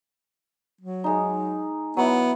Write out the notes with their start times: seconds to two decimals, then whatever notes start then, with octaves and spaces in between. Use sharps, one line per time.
0.81 F#3
1.04 G#3 D#4
1.97 F#3 B3 E4